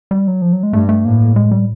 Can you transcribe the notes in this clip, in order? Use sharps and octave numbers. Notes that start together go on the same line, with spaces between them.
G3
F#3
F3
F#3
G#3
G2 A3
A3
A2 A#3
G#3
G3